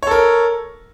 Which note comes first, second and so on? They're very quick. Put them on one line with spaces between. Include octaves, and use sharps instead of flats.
C#5 A4 A#4